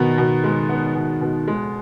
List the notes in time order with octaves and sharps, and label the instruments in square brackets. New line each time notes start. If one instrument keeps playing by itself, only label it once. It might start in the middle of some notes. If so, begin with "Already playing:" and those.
Already playing: [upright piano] B2 B3 [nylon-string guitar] D#3
[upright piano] B2
G#3
B3
B2
B2
G#3